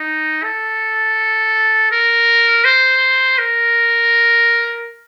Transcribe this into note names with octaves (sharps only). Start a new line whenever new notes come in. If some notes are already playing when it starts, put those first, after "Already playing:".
Already playing: D#4
A4
A#4
C5
A#4